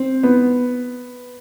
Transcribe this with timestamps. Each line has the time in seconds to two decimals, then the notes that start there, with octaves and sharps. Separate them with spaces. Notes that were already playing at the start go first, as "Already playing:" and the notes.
Already playing: C4
0.23 B3